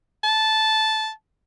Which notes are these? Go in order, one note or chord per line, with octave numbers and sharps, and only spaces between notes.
A5